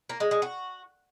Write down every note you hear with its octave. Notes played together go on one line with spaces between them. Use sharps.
A#3
G#3
G#3
F#4